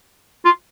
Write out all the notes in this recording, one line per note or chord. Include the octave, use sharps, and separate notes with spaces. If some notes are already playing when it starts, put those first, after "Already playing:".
F4